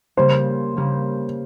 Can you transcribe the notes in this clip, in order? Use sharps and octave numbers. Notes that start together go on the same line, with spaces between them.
C#3 G3 A#3 C5
C#3 G3 A#3